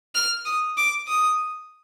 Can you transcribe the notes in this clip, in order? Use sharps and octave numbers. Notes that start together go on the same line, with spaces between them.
F6
D#6
D6
D#6